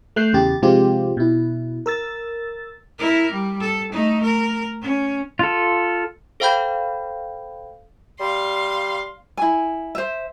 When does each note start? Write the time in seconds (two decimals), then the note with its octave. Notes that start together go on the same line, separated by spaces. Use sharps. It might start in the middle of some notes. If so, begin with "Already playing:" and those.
0.16 A3 F#6 G6 C7
0.33 E2 C#3 G4 A6
0.62 C3 F3 G#3 C4 F4 G4
1.17 B2 E4
1.86 A#4 E6 A6
2.99 E4 A#4
3.31 G3
3.60 A4
3.92 A3 D#4
4.23 A#4
4.82 C#4
5.39 F4 A4
6.40 A4 C5 F5 G5 B5 G6
8.20 G3 F5 C6
9.37 E4 G#5
9.95 C5 E5